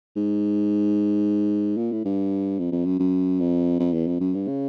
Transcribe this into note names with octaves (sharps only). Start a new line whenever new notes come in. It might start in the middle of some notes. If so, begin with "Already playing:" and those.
G#2
A#2
A2
G2
F2
F2
F#2
F#2
F2
F2
E2
F2
F#2
G2
C#3